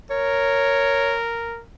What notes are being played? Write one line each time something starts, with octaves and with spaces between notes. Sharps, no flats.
A#4 C#5